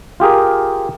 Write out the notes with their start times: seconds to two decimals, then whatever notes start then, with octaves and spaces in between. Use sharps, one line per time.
0.20 F4 G4 G#4 A#4